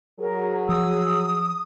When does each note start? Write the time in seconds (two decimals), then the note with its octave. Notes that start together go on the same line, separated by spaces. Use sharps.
0.20 F#3 G#4 A#4
0.69 F3 D#6 E6